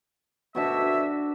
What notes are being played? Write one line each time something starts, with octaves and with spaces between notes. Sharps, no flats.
D2 B2 D4 F#4 E5 C#6